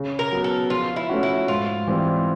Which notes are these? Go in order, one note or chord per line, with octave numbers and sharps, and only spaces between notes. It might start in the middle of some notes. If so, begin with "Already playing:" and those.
Already playing: C#3
A#4
F#3 B3
A4
F3 F4
E4
A3 C#4 F#4
E4
G#2 F4
E3 G3 C4